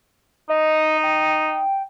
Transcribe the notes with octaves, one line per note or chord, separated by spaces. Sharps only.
D#4 D#5
G5